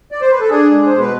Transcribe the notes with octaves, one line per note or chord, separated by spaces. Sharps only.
D5
C5
B4
A4
D4 G#4
G#3
C5
B2
B4